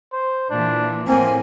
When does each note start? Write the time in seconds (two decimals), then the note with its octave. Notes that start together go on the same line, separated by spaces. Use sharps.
0.13 C5
0.50 A#2 E3 D4
1.08 A2 F3 A#3 C4 G#5